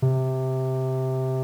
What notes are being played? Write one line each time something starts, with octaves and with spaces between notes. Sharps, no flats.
C3